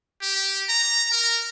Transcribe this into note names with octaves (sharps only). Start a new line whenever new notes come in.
G4
A#5
A#4